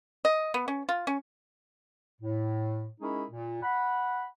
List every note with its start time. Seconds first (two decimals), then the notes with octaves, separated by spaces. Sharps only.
0.25 D#5
0.54 B3
0.68 C#4
0.89 F4
1.07 C#4
2.21 A2
3.01 G#3 C#4 D#4 E4 G#4 A#4
3.30 A#2
3.62 F#5 B5